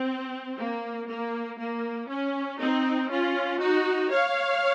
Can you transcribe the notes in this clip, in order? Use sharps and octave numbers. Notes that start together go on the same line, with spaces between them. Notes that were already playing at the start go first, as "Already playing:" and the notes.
Already playing: C4
A#3
A#3
A#3
C#4
C4 D#4
C#4 F4
D#4 F#4
C#5 F5